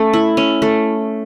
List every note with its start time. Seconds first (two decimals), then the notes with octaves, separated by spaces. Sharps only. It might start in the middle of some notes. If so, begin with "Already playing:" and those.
Already playing: A3 C#4
0.13 E4
0.37 C#4
0.62 A3